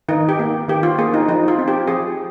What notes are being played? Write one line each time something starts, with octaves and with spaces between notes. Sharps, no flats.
D#3 D#4
G4
A#3
D#3 G4
F4
A#3 G#4
D#4
F3 D#4
F4
C4
G4
F3 G#4